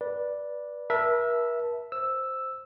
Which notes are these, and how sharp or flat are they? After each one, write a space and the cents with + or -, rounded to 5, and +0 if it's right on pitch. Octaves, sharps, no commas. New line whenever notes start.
B4 -15 D5 +0
A#4 +45 E5 +0 A5 +0
C5 +0 E6 +0